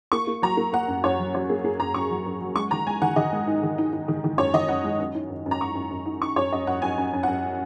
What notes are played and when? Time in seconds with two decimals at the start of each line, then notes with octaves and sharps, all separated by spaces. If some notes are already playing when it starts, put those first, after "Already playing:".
0.12 A#3 C#6
0.27 A#3
0.42 F#3 A#5
0.57 A#3
0.73 A#3 F#5
0.88 F#2
1.04 F#2 C#5
1.19 F#3
1.34 F#3 C#5
1.49 A#3 G#4
1.64 A#3 G#4
1.80 F#2 A#5
1.94 F#2 C#6
2.11 F#3
2.26 F#2
2.41 F#3
2.56 G#3 C#6
2.71 D#3 A#5
2.87 G#3 G#5
3.02 D#3 F#5
3.16 D#3 D#5
3.33 G#3
3.47 D#4
3.63 D#3
3.78 D#4
3.93 D#4
4.08 D#3
4.24 D#3
4.38 F#2 C#5
4.53 D#3 D#5
4.68 F#2 F#5
4.84 G#3
5.00 F#2
5.15 D#4
5.30 F#2
5.46 F#2
5.51 A#5
5.60 F#2 C#6
5.75 F#2
5.91 F#2
6.06 D#4
6.22 D#4 C#6
6.36 F#2 C#5
6.52 F#2 D#5
6.67 F#2 F#5
6.82 F#2 G#5
6.97 F#2
7.13 F#2
7.23 F#2 F#5